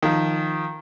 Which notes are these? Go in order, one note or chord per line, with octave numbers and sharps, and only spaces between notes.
D#3 F3